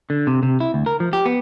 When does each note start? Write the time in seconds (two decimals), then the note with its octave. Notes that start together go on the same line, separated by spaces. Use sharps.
0.10 D3
0.27 C3
0.43 C3
0.60 E4
0.74 D2
0.86 A#4
1.00 F3
1.13 G4
1.26 B3